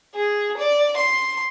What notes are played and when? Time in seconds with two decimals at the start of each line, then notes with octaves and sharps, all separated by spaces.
0.15 G#4
0.57 D5
0.97 C6